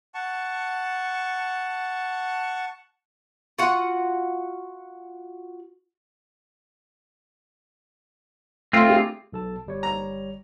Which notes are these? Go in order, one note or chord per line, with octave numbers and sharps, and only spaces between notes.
F#5 A5 C#6
F4 F#4 F#5
A3 C4 F4
D4 G4 G#4
B1 A4 A5
G1 G3 C#5
A#5